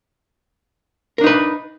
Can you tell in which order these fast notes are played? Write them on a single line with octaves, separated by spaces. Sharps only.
A#4 D4 D#4 B4